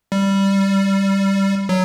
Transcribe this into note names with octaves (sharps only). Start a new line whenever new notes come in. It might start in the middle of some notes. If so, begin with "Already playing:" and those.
G3
F#3